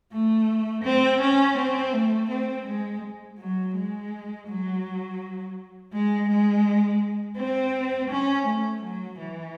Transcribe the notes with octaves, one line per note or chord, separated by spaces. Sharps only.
A3
C4
C#4
C4
A3
C4
G#3
F#3
G#3
F#3
G#3
G#3
C4
C#4
A3
F#3
E3